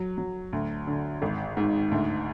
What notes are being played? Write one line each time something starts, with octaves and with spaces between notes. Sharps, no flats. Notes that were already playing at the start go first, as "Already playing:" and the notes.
Already playing: F#3
F#3
D2
D3
G#1
G#2
D2